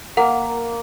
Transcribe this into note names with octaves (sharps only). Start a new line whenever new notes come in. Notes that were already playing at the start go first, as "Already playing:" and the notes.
A#3 A#4 F#5